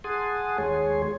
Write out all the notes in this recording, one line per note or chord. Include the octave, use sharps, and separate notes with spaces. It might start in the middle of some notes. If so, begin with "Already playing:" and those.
G#4 F#5 G#5 A5 C6 D#6
D#2 G#3 G#4 C#5 G#5 C6